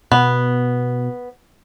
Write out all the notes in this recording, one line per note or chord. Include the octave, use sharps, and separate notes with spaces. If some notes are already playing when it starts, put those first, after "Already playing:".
B2 B3